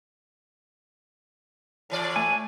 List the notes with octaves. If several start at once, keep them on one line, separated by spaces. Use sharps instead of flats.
A2 E3 D5
A3 G#5